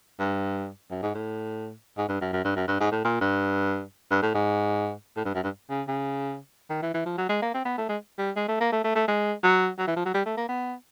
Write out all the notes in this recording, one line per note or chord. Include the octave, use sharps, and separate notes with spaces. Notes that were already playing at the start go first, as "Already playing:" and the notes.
G2
F#2
G#2
A2
G#2
G2
F#2
F#2
G2
F#2
G2
G#2
A2
A#2
G2
G2
A2
G#2
A2
G2
F#2
G2
C#3
C#3
D#3
E3
E3
F3
F#3
G#3
A#3
C4
B3
A3
G#3
G3
G#3
A3
A#3
A3
A3
A3
G#3
F#3
F#3
E3
F3
F#3
G3
A3
A#3
B3